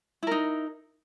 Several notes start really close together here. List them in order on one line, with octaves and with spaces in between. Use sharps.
E4 A#4 D#4